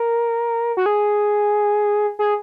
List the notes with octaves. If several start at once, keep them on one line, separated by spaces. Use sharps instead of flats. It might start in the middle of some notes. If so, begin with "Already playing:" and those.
Already playing: A#4
F#4
G#4
G#4